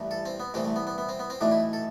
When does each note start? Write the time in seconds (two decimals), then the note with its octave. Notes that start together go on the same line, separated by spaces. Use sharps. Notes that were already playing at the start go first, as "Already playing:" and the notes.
Already playing: A1 G2 E3 A3
0.11 A4
0.25 C4
0.40 B3
0.54 C2 C3 E3 A3 C4
0.65 A3
0.76 B3
0.87 B3
0.98 B3
1.09 C4
1.19 B3
1.30 C4
1.41 B1 A2 E3 A3 D4
1.51 E4
1.73 A4